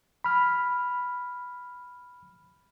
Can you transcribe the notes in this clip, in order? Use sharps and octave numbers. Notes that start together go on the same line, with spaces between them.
B5 F6